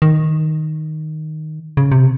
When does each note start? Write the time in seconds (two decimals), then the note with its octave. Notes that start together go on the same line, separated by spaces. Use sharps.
0.02 D#3
1.77 C#3
1.92 C3